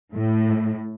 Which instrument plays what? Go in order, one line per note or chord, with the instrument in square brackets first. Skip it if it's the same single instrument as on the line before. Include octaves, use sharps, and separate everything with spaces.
[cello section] A2